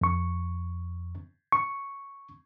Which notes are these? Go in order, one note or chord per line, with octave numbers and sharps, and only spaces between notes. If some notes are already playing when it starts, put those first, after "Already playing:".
F2 C#6
C#6